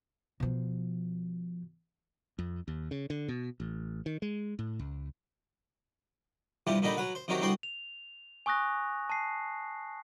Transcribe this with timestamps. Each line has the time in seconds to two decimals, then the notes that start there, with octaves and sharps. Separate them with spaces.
0.40 B2 F3
2.39 F2
2.68 D#2
2.91 C#3
3.10 D3
3.28 B2
3.60 A1
4.06 D#3
4.22 G#3
4.59 A2
4.79 C#2
6.67 G2 C3 E3 F4 G4
6.82 A#2 D3 D#4 G4 D#5 B5
6.97 F#3 B4 F#5
7.15 C5
7.28 C3 D#3 F#3 D#4 F#4 G4
7.41 C2 D3 B3 F#4 G5 C6
7.63 F7
8.46 G#5 C#6 D#6 F#6 A#6
9.09 A5 C7